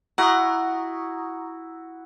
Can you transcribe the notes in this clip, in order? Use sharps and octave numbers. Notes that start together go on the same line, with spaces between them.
E4 F#4 F#5 A#5 C#6 D#6